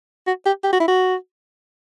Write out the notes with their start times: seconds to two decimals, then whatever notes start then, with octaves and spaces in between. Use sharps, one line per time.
0.27 F#4
0.46 G4
0.64 G4
0.73 F#4
0.80 E4
0.88 F#4